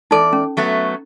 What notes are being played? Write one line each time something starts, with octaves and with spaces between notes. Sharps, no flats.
E2 D#4 A4 D5
C#4
F#3 A3 B3